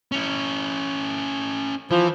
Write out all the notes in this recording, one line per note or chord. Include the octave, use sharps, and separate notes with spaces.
C#4 E4
E3 F3